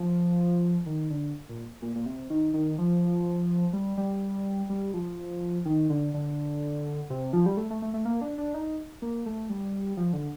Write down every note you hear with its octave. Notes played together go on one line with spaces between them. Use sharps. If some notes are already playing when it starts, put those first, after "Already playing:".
Already playing: F3
D#3
D3
A#2
A#2
A#2
C3
D#3
D#3
F3
G3
G3
G3
F3
D#3
D3
D3
C3
F3
G3
A3
A3
A3
A3
A#3
D4
D4
D#4
A#3
A3
G3
F3
D3